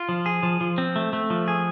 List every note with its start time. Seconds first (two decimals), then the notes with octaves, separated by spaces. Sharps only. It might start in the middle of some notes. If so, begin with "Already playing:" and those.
Already playing: F4
0.09 F3
0.26 G#4
0.43 F3
0.61 F3
0.78 C4
0.96 A3
1.13 A3
1.30 F3
1.48 G#4